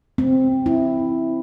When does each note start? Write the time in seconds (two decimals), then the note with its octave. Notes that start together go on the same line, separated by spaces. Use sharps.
0.18 C4
0.66 E4